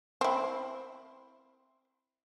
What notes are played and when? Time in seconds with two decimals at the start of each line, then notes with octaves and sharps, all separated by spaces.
0.21 C4 E4